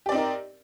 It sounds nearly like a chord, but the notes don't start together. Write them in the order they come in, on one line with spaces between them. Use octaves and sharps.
G4 D5 C4 D#4 A#4